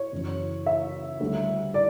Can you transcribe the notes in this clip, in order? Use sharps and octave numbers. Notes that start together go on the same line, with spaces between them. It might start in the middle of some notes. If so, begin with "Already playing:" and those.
Already playing: C#5
F#1 F#2 E3
E5
D2 D3 G3
D5